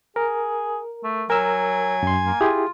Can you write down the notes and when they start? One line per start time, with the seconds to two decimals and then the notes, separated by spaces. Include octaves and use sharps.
0.16 G#4 A#4
1.04 A3
1.30 F#3 A#4 G#5 E6
2.03 F#2 C6
2.26 A#3
2.41 E4 F4 G4 G#4